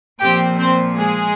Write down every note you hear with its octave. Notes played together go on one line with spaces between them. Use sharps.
A#2 F3 C4 G4 G5
C4 C5
G#3 G#4